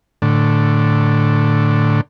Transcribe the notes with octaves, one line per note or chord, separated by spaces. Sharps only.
A2 D3